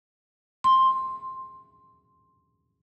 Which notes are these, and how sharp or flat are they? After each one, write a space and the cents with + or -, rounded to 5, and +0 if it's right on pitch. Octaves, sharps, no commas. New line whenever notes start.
C6 +10